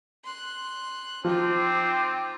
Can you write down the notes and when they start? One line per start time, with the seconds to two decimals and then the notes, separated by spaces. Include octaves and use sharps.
0.25 C6 F#6
1.25 F3 C4 D#4 F4 D6